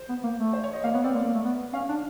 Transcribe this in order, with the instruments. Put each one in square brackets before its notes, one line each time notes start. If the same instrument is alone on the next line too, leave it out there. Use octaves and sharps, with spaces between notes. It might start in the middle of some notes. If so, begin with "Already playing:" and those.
Already playing: [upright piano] C5
[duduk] B3
A#3
A3
[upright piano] C5
C#5
D#5
[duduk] A#3 [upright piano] F5
[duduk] B3 [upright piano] C#5
[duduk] C4 [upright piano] D5
[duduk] A#3
A#3
A3
B3
[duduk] C#4 [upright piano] F5
[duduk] D4